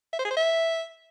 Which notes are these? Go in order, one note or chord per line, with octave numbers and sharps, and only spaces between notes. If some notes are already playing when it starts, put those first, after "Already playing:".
E5
C5
G#4
C5
E5